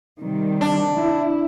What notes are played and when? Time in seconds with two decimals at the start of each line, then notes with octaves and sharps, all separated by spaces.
0.19 C3 D#3 G3
0.61 D4
0.98 E4